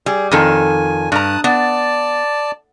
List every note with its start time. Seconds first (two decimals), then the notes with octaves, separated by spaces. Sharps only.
0.06 G3 G#4
0.32 F2 D#3 A4 G#5
1.12 G2 A5 A#5 D#6 F#6
1.44 B3 D5 A5